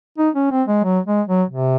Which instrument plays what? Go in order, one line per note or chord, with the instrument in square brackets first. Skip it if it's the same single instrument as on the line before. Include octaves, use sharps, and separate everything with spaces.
[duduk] D#4
C#4
C4
G#3
F#3
G#3
F#3
C3